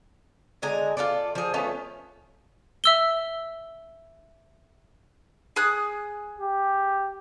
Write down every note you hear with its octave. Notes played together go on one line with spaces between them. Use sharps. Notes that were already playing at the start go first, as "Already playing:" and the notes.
D3 G#3 G#5 A#5
F4 G4 A4 D5
F3 G#4
A3 B3 C#4 F4
E5 E6 G7
G#4 D#6 F#6
G4